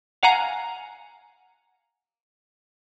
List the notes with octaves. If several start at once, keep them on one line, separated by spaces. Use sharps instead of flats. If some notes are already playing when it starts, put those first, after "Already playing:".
F5 F#5 G#5 A#5